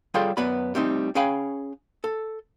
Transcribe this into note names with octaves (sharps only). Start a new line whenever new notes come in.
G3 F4 G#4 A4 C#5 G5
F#2 B3 B4 D5 B5
G3 A3 C4 D#4
C#4 G#4 F5 G5 G#5 B5
A4